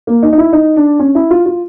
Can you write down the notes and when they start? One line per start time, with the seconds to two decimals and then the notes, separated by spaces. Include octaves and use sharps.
0.07 A#3
0.23 D#4
0.33 D#4
0.38 E4
0.53 D#4
0.76 D4
0.99 C#4
1.15 E4
1.31 F4
1.46 F4